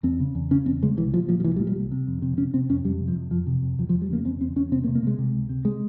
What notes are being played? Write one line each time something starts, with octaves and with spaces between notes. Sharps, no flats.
E2 C4
C#3
E2
C#3 C#4
E2 C4
C#3 G#3
C2 E3
A#2 F3
A#2 F3
F3
C2 E3
G3
A#2
G3
C2
C3
F2
C3
C3 C#4
C3 C4
F2 C#4
F2 G3
C3
F3
F2
F2 F3
C3
F2
E2 F3
F3
E2
G3
C#3 A#3
E2 C4
E2 C4
E2 C#4
C3 C4
A#3
C3
A#3
C3 G#3
C3
C#2
C3
G#3